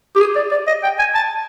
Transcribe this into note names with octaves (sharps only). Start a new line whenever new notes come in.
G4
G#4
D5
D5
D#5
G5
G#5
A5